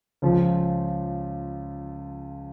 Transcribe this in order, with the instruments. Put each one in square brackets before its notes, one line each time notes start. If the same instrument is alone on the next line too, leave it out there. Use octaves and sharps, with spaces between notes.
[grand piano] C#2 C#3 F3